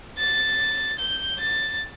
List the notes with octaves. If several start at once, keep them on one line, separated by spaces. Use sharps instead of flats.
A6
G6
A6